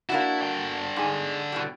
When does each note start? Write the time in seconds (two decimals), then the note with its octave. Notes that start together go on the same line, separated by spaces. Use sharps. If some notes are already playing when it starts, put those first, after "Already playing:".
0.10 A#3 D4 E4 F#4
0.42 D3 G5
0.97 G#2 G#4
1.52 B2 E3 G3